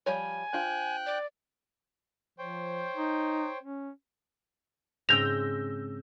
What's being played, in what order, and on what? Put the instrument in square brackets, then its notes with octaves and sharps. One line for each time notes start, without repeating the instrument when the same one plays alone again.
[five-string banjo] F3 G3 C#5 [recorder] G#5
[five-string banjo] D4 F4 C5 [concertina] G5 F#6
[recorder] D5
[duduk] F3 [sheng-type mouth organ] C5 C#5 G5
[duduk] D#4
C#4
[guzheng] G#2 C#3 C4 [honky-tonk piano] E6 G6 A#6 [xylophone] F7